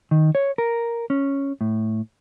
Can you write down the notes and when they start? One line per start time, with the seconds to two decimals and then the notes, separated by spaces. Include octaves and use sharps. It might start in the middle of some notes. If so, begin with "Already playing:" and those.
0.11 D#3
0.35 C#5
0.58 A#4
1.10 C#4
1.61 A2